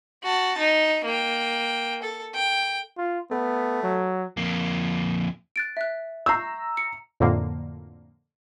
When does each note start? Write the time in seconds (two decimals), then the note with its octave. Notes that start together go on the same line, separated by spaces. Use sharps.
0.23 F#4 A5
0.58 D#4
1.05 A#3 G5
2.02 A4
2.34 G5
2.98 F4
3.31 A3 B3
3.83 F#3
4.37 F2 A#3
5.56 F#6 A6 D7
5.77 E5 F#6
6.26 A#5 C#6 E6 G6 C7
6.77 C#7
7.20 F2 A2 D3 A#3